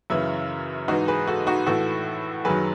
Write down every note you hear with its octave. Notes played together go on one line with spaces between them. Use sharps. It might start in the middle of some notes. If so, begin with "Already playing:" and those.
F#2 C#3 E3 E4
G#2 E3 D#4 F#4
G#4 B4
F#4 A4
D#4 F#4
A2 E3 F#4 A4
F#2 D#3 F#3 G#4 B4